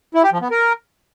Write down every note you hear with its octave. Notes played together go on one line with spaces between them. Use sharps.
E4
G4
F3
B3
A#4